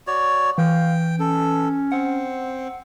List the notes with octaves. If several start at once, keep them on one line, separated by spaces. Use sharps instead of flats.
F#4 C#5 D5
E3 F5 G5
C#4 A4
C4 F#5